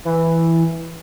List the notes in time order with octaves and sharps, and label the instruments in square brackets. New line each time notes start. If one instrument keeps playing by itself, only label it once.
[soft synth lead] E3